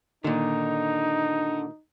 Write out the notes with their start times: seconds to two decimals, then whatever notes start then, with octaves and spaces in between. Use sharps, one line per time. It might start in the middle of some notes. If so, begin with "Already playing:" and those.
0.24 A#2 D3 D#3 D#4